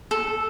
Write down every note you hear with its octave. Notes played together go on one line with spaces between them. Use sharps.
A4